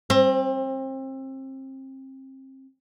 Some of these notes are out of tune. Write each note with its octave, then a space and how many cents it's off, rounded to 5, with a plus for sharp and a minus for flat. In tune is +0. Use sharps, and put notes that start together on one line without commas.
C4 +30